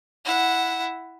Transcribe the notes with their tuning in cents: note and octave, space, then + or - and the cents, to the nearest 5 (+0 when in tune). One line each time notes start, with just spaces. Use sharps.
E4 +0 F#5 +0